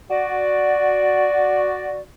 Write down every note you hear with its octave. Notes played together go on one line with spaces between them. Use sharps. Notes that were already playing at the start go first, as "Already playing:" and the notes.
F#4 D5